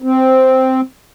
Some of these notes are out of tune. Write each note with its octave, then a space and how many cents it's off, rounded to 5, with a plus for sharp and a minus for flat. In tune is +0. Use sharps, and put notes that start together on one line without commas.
C4 -5